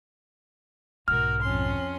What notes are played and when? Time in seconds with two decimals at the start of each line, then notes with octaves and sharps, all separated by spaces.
1.08 B1 G#2 F#4 A#4 F6
1.42 F2 C#4 C6